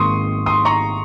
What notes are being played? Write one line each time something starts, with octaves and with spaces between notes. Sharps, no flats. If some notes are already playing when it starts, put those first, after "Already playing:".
Already playing: G#1 G#2 D#3 A#3 D#4 C6 C#6 D#6
C6 D#6
A#5 C#6